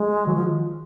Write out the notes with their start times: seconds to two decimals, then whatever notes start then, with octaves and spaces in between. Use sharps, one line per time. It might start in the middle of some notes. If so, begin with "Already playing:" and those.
Already playing: G#3
0.26 D#3 F#3
0.35 F3